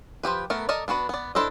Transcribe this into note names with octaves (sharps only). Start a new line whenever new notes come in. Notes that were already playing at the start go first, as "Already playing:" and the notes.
F3 F#3 G4 B4
A3 B3 A#4
A4 A#4 D5 D#5
B3 D4 F#4 B4
B3 D5
D4 E4 A4 C5 D#5